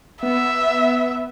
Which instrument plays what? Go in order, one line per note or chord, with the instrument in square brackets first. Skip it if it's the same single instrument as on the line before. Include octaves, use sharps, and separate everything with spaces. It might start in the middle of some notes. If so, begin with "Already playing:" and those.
[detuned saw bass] B3 [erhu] E5